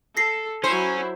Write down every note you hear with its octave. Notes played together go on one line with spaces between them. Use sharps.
A4 A#6 C7
F#3 C#4 E4 C5